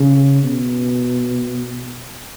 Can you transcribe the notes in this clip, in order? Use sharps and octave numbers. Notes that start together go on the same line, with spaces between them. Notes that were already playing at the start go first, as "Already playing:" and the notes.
Already playing: C#3
B2